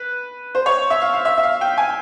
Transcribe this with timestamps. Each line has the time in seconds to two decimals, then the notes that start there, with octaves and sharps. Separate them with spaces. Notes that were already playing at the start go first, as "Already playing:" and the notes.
Already playing: B4
0.55 C5
0.66 C#5
0.90 E5
1.01 F5
1.13 F5
1.25 E5
1.38 E5
1.43 F5
1.61 G5
1.78 G#5